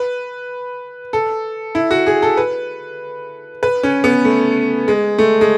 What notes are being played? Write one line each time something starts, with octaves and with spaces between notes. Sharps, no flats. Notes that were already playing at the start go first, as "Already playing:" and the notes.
Already playing: B4
A4
E4
F#4
G#4
A4
B4
B4
C#4
B3
A3
G#3
A3
G#3